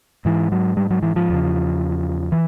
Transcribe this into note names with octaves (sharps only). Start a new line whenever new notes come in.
G#2 E3
F#3
G3
F#3
E3
F3
E2 C#3
E3